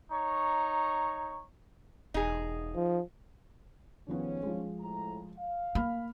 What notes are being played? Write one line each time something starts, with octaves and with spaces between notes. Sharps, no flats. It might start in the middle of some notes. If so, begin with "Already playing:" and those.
D#4 C#5 A#5 C#6
E1 D#4 G#4
F3
G#2 D#3 F3 G3 B3 C#4
F3 G#3
F2 A2 A#5
F5
A#3 B5 F6